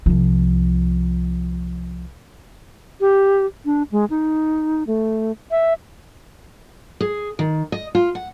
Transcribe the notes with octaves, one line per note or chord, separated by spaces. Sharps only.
C2 F3
G4
D4
G#3
D#4
A3
E5
G#4
D#3
D#5
F4
F#5